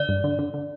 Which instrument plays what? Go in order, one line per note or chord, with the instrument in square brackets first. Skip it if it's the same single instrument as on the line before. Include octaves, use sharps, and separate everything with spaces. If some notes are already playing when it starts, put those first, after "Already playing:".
Already playing: [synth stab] D3 [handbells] D5
[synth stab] G2
D3
D3
D3